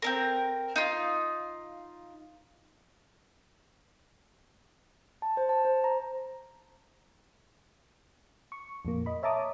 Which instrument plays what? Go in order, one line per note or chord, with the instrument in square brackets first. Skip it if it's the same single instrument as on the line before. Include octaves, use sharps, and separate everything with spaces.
[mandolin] C4 C#4 A#4
D#4 F4
[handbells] A5
C5
A5
C5
A#5
[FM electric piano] C#6
F2 A#2 A#3
D#5 B5
C#5 E5 A5 A#5 D6 D#6